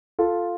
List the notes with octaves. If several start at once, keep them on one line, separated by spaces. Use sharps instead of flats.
F4 A4